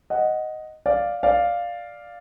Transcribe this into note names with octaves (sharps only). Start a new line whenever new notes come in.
D#5 F#5
D5 F5
D5 F5